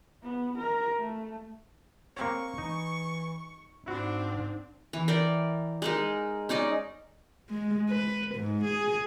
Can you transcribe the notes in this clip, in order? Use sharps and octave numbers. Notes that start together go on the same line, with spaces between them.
B3
A#4
A3
A#3 C4 C#5 C#6
E3 D#4
G#2 C4 D4 E4 F#4
E3
A#4 D5 G5
G#3 D#4 A#4
C#4 D#4 D5 D#5
G#3
B4
G#2
G#4